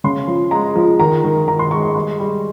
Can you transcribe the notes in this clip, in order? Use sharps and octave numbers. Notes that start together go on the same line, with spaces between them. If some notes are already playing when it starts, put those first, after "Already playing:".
C#3 C6
F3
G#3 A#5
F3
D#3 A#5
D#3
D#3 A#5
C6
G#3 C#6
C#6
G3 C6
G3